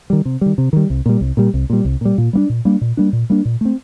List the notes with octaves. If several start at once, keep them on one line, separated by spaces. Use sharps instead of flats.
D#3 G3
C3
D#3 G3
C3
D#3 G3
C2
A#2 G3
C2
A#2 G3
C2
A#2 G3
C2
A#2 G3
A#2
G3 A#3 D4
A#2
G3 A#3 D4
A#2
G3 A#3 D4
A#2
G3 A#3 D4
A#2
A3 C4